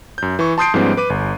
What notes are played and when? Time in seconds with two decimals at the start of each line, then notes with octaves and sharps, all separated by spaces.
0.18 F#2 G6
0.39 E3 C#6
0.58 A5 C6 D#6 G6 C7 D7
0.74 G#2 F3 G3 B3 C#4
0.97 B4 D6 D#7
1.10 G1